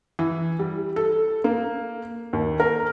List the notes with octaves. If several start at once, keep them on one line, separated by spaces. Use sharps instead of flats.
E3
G3
A4
A#3
D#2
A#4